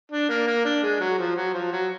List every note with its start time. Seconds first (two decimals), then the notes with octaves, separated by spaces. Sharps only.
0.11 D4
0.29 A#3
0.47 A#3
0.65 D4
0.83 G#3
1.00 F#3
1.18 F3
1.36 F#3
1.54 F3
1.72 F#3